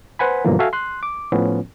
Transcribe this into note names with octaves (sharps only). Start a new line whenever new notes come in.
B4 C5 F#5 G#5 B5
G2 B2 D3 E3 F3 A#3
F#4 A4 E5 F5 G#5
C6 F#6
D6
A2 F3 B3 C#4